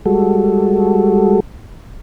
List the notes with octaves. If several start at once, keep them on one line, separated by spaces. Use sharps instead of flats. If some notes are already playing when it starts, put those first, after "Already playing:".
G3 G#3 F#4 A4